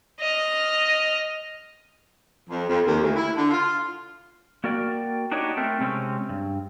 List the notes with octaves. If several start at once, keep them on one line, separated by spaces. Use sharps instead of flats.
D#5 F6
F2
F2
D#2
D2
E4
D3
F4
A#3 F#4 A#4 D5 G5
D4 D#4 F#4 G4 C#5 D#5
A3 C4 A#4
C3 G#3 C4 C#4
G2